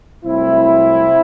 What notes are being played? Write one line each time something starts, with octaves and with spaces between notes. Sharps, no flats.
C2 C3 F#3 A3 C4 E4